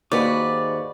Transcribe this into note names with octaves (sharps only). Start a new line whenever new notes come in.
D#2 G#2 D#4 F#4 B4 D5